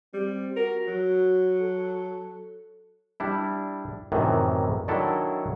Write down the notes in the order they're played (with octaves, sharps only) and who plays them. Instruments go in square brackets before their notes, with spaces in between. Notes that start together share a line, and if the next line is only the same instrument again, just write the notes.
[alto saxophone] G3 [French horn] C4
[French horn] F#4 [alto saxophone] A#4
[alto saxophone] F#3
[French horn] A4
[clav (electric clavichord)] G3 D4 E4
F#2 A2 C3 D#3 E3
D3 D#3 F#3 D4 E4 A4